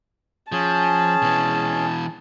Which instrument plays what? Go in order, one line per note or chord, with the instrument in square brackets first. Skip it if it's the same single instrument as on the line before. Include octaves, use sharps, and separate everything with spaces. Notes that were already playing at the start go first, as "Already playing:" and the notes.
[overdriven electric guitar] F3 [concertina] C#4 G#4 [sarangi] A5
[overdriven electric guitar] B2 E3